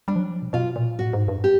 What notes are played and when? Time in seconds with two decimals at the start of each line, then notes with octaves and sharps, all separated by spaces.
0.08 G3 D4
0.16 F3
0.20 F#3
0.31 F3
0.42 B2
0.53 B2 F4
0.76 A#2
0.98 A2 F#4
1.13 G#2
1.28 G2
1.44 G4